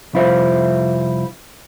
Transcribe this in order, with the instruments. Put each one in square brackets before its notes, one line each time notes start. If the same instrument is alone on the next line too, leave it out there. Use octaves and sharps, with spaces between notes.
[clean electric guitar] C2 F2 E4 F4 C5 E5